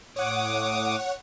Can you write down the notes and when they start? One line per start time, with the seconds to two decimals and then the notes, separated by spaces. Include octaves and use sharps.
0.16 A2 C#5 F#5 D6 D#6